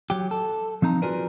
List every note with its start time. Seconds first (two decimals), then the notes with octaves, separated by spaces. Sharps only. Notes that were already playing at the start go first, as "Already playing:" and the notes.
0.10 F#3 G4
0.31 A4
0.82 F3 C4 D#4 A#5
1.02 F4 F#4 G#4 A#4 B4 D5